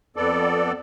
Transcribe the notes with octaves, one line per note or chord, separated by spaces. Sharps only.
F2 B3 A4 D5